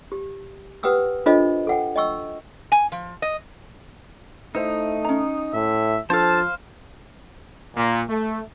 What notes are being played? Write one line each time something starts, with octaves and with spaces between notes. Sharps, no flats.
G4
G4 B4 F#5 G5 D#6 E6
D4 F4 A4 C5 D#5
A4 F#5 G5
D#5 G5 C#6 E6
G#5
F3
D#5
A3 D#4 E4 C5 E5
C#4 A#5
A2 E5
F3 D4 A4 C5 F5 A5
A#2
A3